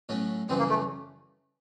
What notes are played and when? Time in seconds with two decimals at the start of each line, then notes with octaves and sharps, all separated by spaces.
0.09 A2 F#3 A3 C#4
0.49 F#2 C#3 E3 G3 C4
0.59 A#3
0.69 A3